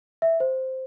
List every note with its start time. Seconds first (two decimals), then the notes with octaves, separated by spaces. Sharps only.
0.22 E5
0.40 C5